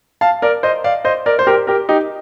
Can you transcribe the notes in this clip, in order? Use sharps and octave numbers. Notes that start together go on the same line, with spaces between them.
F5 A5
A#4 D5
C5 D#5
D5 F5
C5 D#5
A#4 D5
C5
G4 A#4
G4 A#4
D#4 G4